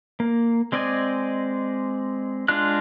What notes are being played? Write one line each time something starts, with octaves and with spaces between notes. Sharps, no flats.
A#3
G#3 C4 D5 D#5 G#5
G#3 D4 F4 F#6